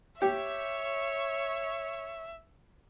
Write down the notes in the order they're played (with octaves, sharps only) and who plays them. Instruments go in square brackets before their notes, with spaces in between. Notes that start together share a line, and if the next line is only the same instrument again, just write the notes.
[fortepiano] G4 [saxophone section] C#5 [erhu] E5